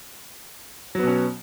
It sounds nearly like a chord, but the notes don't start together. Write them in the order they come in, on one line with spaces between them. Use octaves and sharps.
F#3 B3 B2 C#4